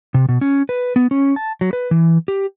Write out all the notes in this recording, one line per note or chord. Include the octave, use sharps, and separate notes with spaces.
C3
B2
C#4
B4
B3
C#4
A5
F#3
B4
E3
G4